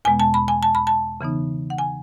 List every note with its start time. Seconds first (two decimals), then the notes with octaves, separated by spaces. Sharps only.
0.05 E2 B2 G#3 B3 G#5
0.20 A5
0.34 B5
0.48 G#5
0.63 A5
0.75 B5
0.87 A5
1.21 C#3 E3 B3 D#4
1.70 F#5
1.78 G#5